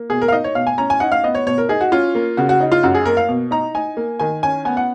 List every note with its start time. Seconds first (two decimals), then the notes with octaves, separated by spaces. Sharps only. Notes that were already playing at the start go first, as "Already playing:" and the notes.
Already playing: A#3
0.10 B2 G#4
0.22 A#4
0.28 F5
0.32 D#4 D#5
0.44 C#5
0.55 B2 F5
0.67 G#5
0.78 C#4 A#5
0.90 G#5
1.00 D#4 F#5
1.12 F5
1.24 B3 D#5
1.35 C#5
1.46 B2 C#5
1.58 A#4
1.69 D#4 G#4
1.81 F#4
1.92 C#4 F4
2.15 A#3
2.37 C#3 F#4
2.49 F#4
2.61 D#4
2.72 F4
2.83 F#2 F#4
2.95 G#4
3.06 A#3 A#4
3.17 F5
3.29 B2
3.51 D#4 A#5
3.75 D#4 G#5
3.97 A#3
4.19 D#3 G#5
4.43 C#4 G#5
4.65 B3 G#5
4.77 F#5